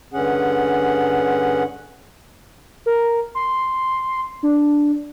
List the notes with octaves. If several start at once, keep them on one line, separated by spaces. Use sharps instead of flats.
G2 D3 C#4 G#4 F#5
A#4
C6
D4